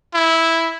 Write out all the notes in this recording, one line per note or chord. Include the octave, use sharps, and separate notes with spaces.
E4